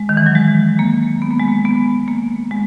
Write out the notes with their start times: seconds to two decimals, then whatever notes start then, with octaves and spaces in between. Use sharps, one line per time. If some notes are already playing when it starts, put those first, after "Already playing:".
Already playing: G#3
0.09 D#3
0.17 E3
0.26 F#3
0.35 G#3
0.79 A#3
1.22 B3
1.31 A#3
1.40 G#3
1.48 A#3
1.65 B3
2.08 A#3
2.51 G#3